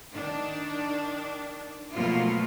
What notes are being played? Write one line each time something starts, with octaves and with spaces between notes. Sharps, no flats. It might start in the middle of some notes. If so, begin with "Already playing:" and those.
D#3 D4
B2 F3 F#3 A3 A#3 F4